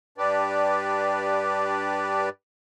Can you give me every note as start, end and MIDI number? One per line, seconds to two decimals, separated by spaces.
0.18 2.29 43
0.18 2.29 62
0.18 2.29 67
0.18 2.29 71
0.18 2.29 74